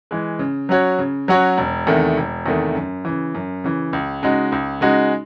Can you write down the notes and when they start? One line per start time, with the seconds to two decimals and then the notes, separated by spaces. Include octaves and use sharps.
0.11 E3 G#3
0.39 C#3
0.69 F#3 C#4 F#4 C#5
0.99 C#3
1.28 F#3 C#4 F#4 C#5
1.58 E1
1.87 E2 C3 D#3 A3
2.17 E1
2.46 E2 C3 D#3 A3
2.75 F#2
3.05 C#3 E3
3.35 F#2
3.64 C#3 E3
3.93 C#2
4.23 C#3 G#3 D#4 F#4
4.52 C#2
4.81 C#3 G#3 D#4 F#4